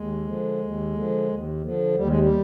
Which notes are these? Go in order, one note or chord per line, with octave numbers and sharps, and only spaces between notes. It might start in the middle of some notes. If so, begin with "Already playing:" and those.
Already playing: D#2 G#3
D3 F3
D#2
D3 F3
D#2
D3 F3
D#2 G3
G#3
G3